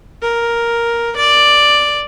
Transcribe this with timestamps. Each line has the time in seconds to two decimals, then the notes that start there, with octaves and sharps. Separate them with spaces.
0.22 A#4
1.16 D5